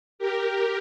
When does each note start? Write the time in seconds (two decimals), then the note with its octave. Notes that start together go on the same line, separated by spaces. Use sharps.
0.19 G4 A#4